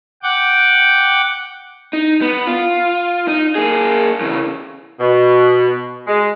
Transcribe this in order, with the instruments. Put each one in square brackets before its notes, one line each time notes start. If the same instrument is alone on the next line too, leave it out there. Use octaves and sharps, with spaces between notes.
[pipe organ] F#5 G5 D6
[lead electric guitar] D#4
B3
F4
D#4
A#3 G#4
C#3 E3
[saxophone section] B2
G#3